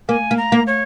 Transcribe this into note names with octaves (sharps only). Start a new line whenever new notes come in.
A#3 G#5
A#3
A#5
A#3
C#5